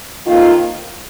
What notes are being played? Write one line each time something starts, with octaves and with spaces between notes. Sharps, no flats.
F2 D#3 A#3 F4